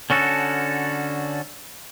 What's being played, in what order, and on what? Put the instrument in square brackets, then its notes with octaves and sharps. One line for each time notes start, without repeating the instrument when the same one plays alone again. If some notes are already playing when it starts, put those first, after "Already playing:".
[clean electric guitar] D3 C#4 F#4 A4